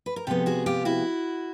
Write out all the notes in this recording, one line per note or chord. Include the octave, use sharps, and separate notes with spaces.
B4
A#4
C3 F3 G#3 B3 G4 A4
F#4 G#4
F4 G4
E4 F#4